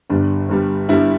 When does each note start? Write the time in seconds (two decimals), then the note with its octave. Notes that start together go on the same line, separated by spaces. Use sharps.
0.10 G1 G2 G3 D4
0.49 G1 G2 G3
0.88 G1 G2 D3 G3 E4